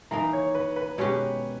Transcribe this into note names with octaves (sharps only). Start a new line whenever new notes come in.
E3 A#3 D#4 A#5
C#5
B4
B4
B2 G#3 C#4 G4 C#5